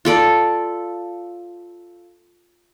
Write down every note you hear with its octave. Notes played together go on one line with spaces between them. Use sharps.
F4 A4 D5